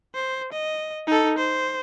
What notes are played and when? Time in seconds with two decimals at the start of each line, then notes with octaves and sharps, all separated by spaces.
0.15 C5
0.53 D#5
1.07 D#4 A4
1.38 C5